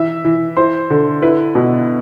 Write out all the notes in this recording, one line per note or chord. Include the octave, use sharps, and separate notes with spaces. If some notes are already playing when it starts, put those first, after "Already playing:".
Already playing: E3 E5
E3
E4 C5
D3
E4 B4
B2